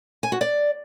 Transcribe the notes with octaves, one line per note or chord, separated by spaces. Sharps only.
G#5
F#4
D5